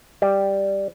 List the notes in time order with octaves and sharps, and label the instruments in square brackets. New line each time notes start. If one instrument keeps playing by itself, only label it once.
[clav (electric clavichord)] G3